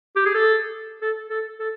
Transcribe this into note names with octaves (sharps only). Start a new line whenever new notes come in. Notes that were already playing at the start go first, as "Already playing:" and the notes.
G4
G#4
A4
A4
A4
A4